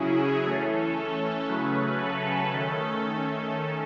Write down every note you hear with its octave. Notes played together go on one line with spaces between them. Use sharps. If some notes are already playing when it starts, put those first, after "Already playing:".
Already playing: C#3 F#3 C#4 E4 G#4
E3 A3 C#4 A4
A4
C#3 F#3 A3 C#4 B4
A4
D#3 A3 C#4